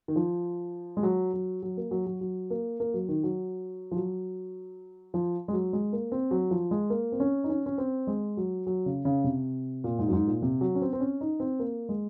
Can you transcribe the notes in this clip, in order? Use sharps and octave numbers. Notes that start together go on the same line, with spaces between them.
D#3
F3
G#3
F#3
F#3
F#3
A#3
F#3
F#3
F#3
A#3
A#3
F#3
D#3
F#3
F3
F#3
F3
G#3
F#3
G#3
A#3
C4
F#3
F3
G#3
A#3
C4
C#4
D#4
C#4
C#4
C4
G#3
F#3
F#3
C#3
C#3
C3
A#2
G#2
F#2
G#2
A#2
C3
F#3
C#4
C4
C4
C#4
D#4
C4
A#3
G#3